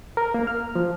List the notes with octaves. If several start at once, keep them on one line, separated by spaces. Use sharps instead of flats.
A#4
A#3
F6
F3